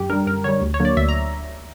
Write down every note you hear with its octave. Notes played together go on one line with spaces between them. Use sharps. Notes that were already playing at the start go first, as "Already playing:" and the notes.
Already playing: F#2 G4
D3 G3 A#4
F#2 A#4
D3 G3 C#5
D2
C#5
D3 F#3 A#3
D5
D2 E5
A#5